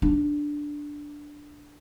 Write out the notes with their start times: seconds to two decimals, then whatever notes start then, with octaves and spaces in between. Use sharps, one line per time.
0.02 D4